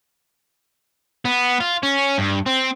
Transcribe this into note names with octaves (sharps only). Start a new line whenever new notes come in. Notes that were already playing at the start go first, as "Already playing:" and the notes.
B3
F4
C#4
G2
C4